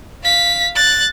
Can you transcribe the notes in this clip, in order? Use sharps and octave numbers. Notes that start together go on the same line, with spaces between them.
F5 B6
F#6 A6